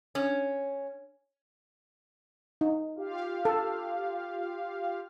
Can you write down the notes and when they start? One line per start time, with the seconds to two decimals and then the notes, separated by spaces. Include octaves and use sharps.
0.15 C#4
2.61 D#4
2.96 F4 G4 F5
3.45 A4